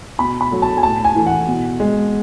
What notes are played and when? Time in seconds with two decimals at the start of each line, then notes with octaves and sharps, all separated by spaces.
0.19 B2 B5
0.41 B5
0.51 F#3 A3
0.62 A5
0.77 G#5
0.83 A2 A5
1.05 G#5
1.15 E3 A3
1.26 F#5
1.47 B2
1.80 G#3